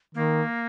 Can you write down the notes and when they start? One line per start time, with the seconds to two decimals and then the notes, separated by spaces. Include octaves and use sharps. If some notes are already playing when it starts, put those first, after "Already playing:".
0.15 D#3 A#3